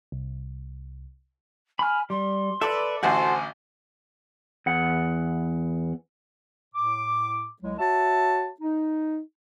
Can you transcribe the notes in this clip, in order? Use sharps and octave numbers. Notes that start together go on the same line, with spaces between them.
C2
G#5 B5 F6
G3 C6
A4 B4 D5 E5
A1 D2 F#4 A4 C5 F#5 G#5
E2 F#5
A2 D6
C2 F#3 G#3
F#4 C#5 E5 A5
D#4